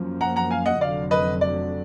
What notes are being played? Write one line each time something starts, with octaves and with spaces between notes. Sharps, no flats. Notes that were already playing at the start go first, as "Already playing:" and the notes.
Already playing: F#2 F3 A#3
F#5 A#5
F#5 A#5
F5 G#5
D#5 F#5
F1 F2 D3 F#3 D5 F5
B4 D#5
D5